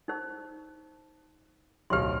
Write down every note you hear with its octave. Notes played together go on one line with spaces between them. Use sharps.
D#4 C5
D1 B1 G4 C6 F6